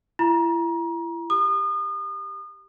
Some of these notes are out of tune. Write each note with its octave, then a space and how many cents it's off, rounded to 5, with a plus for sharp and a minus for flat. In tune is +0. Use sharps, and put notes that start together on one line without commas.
E4 +35 A#5 +30
G4 +0 D#6 -35